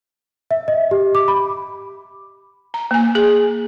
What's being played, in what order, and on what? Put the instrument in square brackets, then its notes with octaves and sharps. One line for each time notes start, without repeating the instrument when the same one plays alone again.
[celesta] E5
D#5
G4
D6
B5
[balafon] A#5
A#3 G#5
G#4